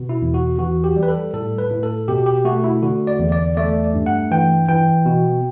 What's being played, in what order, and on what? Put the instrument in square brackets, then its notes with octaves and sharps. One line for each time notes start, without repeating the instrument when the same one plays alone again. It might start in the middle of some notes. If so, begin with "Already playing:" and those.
Already playing: [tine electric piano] B2
E4
E2
F#4
E3 F#4
G4
G3
B4
A4
A2 A4
B4
A2
A4
B2 G4
G4
A3 F#4
E4
D3 F#4
D5
E2
D5
A3 D5
G2
F#5
E3 G5
E3 G5
B2